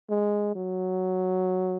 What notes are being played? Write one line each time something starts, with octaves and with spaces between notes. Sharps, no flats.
G#3
F#3